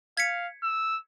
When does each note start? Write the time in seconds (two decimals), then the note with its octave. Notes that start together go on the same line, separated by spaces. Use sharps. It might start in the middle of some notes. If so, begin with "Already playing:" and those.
0.17 F5 G#6 B6 C#7
0.63 E6